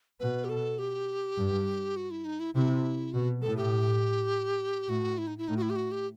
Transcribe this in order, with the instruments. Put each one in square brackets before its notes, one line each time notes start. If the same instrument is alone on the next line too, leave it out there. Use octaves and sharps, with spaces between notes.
[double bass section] B2 [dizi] B4
[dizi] G4
A4
G4
[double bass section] G2
[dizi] F#4
E4
D#4
E4
[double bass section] C3 [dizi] E4
[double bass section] B2 [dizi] F#4
[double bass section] A2 [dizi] A4
[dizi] G4
[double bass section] A2 [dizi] F#4
[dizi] E4
D#4
E4
[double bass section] A2 [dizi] D#4
[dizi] F#4
E4
G4
F#4
G4